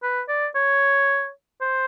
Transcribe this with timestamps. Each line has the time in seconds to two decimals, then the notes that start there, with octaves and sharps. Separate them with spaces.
0.03 B4
0.29 D5
0.55 C#5
1.61 C5